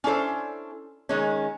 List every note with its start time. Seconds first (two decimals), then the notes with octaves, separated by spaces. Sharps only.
0.04 C#4 D4 E4 A4 C5
1.09 D#3 G#3 C#4